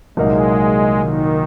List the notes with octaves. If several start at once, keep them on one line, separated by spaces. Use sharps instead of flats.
C2 A#2 F#3 G#3 A#3 D#4
D#3